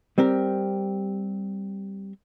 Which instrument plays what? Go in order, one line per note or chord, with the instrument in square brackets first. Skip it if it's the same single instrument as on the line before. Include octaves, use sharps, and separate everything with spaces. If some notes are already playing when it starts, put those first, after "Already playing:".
[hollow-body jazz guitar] G3 C4 G4 A#4